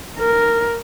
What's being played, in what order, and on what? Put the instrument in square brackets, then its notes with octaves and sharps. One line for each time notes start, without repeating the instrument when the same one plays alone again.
[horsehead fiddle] A#4